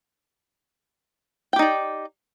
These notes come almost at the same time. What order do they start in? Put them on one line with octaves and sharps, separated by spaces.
G5 G4 D#4 D5